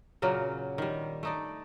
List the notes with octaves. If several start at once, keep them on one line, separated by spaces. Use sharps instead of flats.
A#2 C#3 F#3 A#3
D#3 G3
A3 D#4 D5